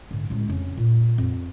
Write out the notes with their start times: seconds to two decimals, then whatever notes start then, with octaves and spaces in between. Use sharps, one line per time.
0.11 G#2 D3
0.30 A1 G#3
0.47 F2 C#3
0.77 A#2
1.18 F2